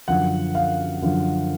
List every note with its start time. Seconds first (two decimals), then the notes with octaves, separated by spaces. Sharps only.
0.08 F#2 D3 F3 F#5
0.55 F5
1.02 F#2 D3 F3